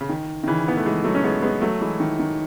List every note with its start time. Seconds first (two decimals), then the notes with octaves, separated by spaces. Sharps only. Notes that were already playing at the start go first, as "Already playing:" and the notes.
0.01 C#3
0.09 D#3
0.44 D#3
0.47 C#3 E3
0.68 B3
0.77 A3
0.86 E3 G#3
1.04 F#3 A3
1.15 C#4
1.24 G#3 B3
1.42 G#3 B3
1.61 F#3 A3
1.81 E3 G#3
2.00 D#3
2.19 D#3